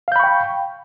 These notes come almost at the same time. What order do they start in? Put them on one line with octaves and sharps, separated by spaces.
F5 G6 B5 C#6 G5